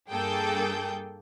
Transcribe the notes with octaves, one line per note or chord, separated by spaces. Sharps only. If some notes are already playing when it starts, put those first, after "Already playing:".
G2 A#3 G#4 A4 G5 G6